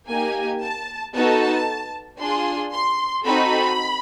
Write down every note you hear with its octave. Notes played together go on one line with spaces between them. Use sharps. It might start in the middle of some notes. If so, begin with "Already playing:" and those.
A#3 D#4 G4 G#5
A5
B3 D#4 F#4 A4 A5
D4 F4 G#4 C6
C6
C4 D#4 F#4 A4 B5